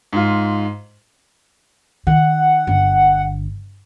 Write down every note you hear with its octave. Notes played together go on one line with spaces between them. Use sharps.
G#2 F4
D#3 F#5
G1